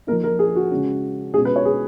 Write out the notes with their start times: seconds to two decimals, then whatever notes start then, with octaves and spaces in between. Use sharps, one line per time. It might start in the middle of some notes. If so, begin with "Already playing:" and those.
0.07 F3 A#3 D#4 A#4
0.23 A#4
0.39 G#4
0.56 F#4
0.71 C#3 G#3 C#4
1.34 B2 G#3 C#4 G#4
1.45 B4
1.56 C#5
1.65 G#4